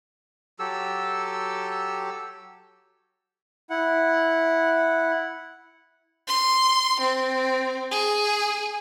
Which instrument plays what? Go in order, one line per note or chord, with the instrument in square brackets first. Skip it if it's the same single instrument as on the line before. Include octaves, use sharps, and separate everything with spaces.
[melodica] F#3 G4 A4 E6
[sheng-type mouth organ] E4 F#5
[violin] C6
C4
G#4